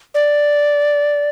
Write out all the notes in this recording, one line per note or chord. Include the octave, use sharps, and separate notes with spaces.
D5